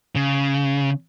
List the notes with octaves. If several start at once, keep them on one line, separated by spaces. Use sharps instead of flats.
C#3